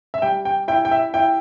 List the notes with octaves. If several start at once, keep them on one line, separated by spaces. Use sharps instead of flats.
E5
G3 G5
G5
E4 G5
G5
E5
E4 G5